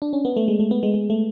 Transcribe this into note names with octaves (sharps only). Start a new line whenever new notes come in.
D4
C#4
B3
A3
G#3
A3
B3
G#3
G#3
A3